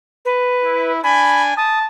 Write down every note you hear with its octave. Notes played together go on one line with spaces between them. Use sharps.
B4
E4
D4 G#5 B5
A5 D#6